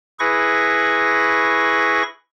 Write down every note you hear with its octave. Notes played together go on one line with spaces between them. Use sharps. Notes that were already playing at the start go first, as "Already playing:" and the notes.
E4 G#4 B4 C#6 A#6